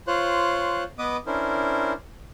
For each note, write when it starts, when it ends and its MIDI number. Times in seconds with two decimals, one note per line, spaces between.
0.07 0.84 65
0.07 0.84 72
0.07 0.84 73
0.07 0.84 90
0.98 1.17 59
0.98 1.17 71
0.98 1.17 75
0.98 1.17 86
0.98 1.17 87
1.27 1.93 61
1.27 1.93 62
1.27 1.93 64
1.27 1.93 70
1.27 1.93 72